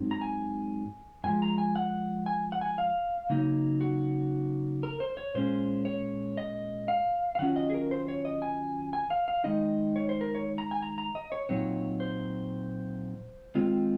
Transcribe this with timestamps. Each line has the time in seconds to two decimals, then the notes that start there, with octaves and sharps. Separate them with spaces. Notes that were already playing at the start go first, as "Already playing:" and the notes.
Already playing: G#2 F#3 C4 D#4
0.11 A#5
0.21 G#5
1.24 F#2 F3 G#3 G#5
1.42 A#5
1.58 G#5
1.75 F#5
2.26 G#5
2.52 F#5
2.61 G#5
2.78 F5
3.30 C#3 F#3 A#3 D#4
3.81 F#4
4.83 A#4
5.00 C5
5.17 C#5
5.34 A#2 G#3 C#4 C5
5.85 C#5
6.37 D#5
6.88 F5
7.35 F5
7.39 D#3 F#3 C#4 F4 F#5
7.56 D#5
7.70 G#4
7.74 A#4
7.91 C5
8.08 C#5
8.25 D#5
8.42 G#5
8.93 G#5
9.10 F5
9.28 F5
9.44 D#3 G#3 D#4 D#5
9.96 C#5
10.09 C5
10.21 A#4
10.35 C#5
10.58 A#5
10.71 G#5
10.83 A#5
10.98 A#5
11.15 D#5
11.32 C#5
11.49 A#2 F#3 C4 D#4 C#5
12.00 C5
13.55 D#3 G#3 C4 F4